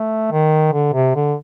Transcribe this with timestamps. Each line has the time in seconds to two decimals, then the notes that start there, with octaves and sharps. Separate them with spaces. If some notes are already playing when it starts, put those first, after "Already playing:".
Already playing: A3
0.31 D#3
0.73 D3
0.94 C3
1.15 D3